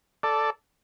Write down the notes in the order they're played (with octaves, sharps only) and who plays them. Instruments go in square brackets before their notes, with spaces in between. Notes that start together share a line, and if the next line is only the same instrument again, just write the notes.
[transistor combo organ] A4 D5